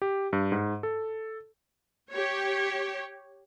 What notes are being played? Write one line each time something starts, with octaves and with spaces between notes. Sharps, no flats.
G4
G2
G#2
A4
G4 C#5